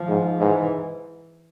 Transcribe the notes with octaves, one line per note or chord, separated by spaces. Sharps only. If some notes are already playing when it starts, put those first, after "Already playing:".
Already playing: F3
G#2
G#2 E3